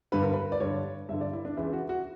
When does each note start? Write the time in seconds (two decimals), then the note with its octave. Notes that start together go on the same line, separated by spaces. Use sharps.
0.12 G2 D3 B4
0.23 A#4
0.33 B4
0.52 D5
0.60 G2 D3 C#5
1.09 G2 E5
1.13 D3
1.21 D5
1.33 E4
1.45 D4
1.57 C#2 C#3 E3 E4
1.73 F#4
1.89 F#4